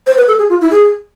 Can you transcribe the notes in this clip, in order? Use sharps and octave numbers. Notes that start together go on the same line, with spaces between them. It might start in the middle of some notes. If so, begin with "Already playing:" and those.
C5
B4
A4
G#4
F4
E4
G#4